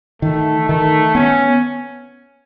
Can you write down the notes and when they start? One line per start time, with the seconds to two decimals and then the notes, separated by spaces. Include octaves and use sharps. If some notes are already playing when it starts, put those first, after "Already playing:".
0.22 D#3 A3
0.69 D#3 A3
1.15 B3 C#4